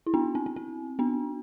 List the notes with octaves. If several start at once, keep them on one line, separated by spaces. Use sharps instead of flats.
E4
B3 D4
C4
C4
C4
B3 D4